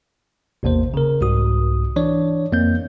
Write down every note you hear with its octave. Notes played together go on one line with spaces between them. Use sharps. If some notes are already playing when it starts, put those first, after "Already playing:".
A1 E2 C3 A#3 C5
C#3 A#4
C2 G#2 F#4 D#6
E3 D4 C#5 D5
F2 A#3 C4 G6